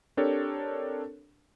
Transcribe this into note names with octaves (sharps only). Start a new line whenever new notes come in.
C4 D4 G4 A4 A#4 C#5